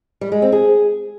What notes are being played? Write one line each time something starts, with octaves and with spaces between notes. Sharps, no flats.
G3
G#3
C4
G#4